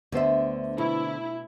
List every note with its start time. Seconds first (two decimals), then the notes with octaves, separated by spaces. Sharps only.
0.12 D2 D3 B3 C5 E5
0.78 B2 E4